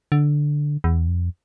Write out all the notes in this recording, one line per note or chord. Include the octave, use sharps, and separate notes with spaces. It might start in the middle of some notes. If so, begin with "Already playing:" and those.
D3
E2
F2